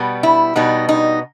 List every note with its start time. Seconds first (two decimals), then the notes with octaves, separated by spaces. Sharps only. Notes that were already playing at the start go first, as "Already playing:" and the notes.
Already playing: B2 G3 B3
0.23 E4
0.55 B2 G3 B3 D#4
0.89 D#4